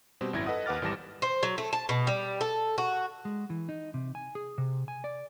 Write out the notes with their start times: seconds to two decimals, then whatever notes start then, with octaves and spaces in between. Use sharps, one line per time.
0.21 B2 G3 C4
0.33 G#1 F#2 E4 G#6 A#6
0.46 A4 B4 D#5 F#5 D#6
0.66 D#2 B4 F#5 D6 F6 A6
0.82 G#1 E3 G3 A5 A#6 E7
1.22 C5
1.43 F#3
1.58 A3
1.73 A5
1.89 B2
2.07 G3
2.41 A4
2.78 F#4
3.25 G#3
3.50 E3
3.69 D#4
3.94 C3
4.15 G#5
4.35 G#4
4.58 C3
4.88 G#5
5.04 D5